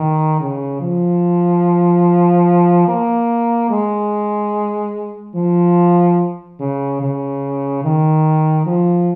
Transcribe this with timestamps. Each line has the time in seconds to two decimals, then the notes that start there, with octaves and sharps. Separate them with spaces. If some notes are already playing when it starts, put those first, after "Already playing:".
Already playing: D#3
0.40 C#3
0.81 F3
2.88 A#3
3.70 G#3
5.35 F3
6.60 C#3
7.01 C#3
7.84 D#3
8.66 F3